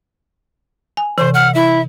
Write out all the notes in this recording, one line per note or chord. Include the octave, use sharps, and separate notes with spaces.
G#5
C3 E3 C5
F#5 F6
E4 E5